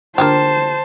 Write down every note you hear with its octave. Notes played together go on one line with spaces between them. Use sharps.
D3 A#3 F4 G4 C5 A5